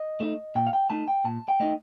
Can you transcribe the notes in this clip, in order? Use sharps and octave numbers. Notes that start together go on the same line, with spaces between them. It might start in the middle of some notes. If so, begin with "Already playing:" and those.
Already playing: D#5
A3 D#4
A#2 G5
F5
G5
A3 D#4 A5
G5
A#2 A5
G5
A3 D#4 D#5